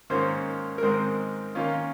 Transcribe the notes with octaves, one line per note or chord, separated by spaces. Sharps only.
G#2 D#3 A#3 C#4 F4 C5
A#4
G#2 D#3 G#3 C4 C5
D#3 A#3 C#4 F4